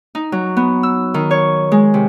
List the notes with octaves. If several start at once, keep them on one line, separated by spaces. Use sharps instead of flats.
D#4
F#3
B3
E6
D#3
C#5
G#3
C3